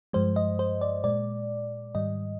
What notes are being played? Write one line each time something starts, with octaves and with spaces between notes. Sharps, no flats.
G2 F3 G#3 C5
D#5
C5
D5
A#2 G#3 D5
G#2 D#3 G3 D#5